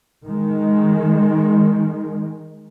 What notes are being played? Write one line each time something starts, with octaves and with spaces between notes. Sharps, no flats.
D#3 G#3